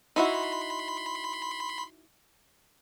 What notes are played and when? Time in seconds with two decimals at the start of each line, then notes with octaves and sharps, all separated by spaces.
0.16 D#4 E4 F#4 B5 C6